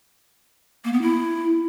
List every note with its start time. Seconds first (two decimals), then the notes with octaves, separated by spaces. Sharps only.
0.85 A#3
0.93 B3
1.02 E4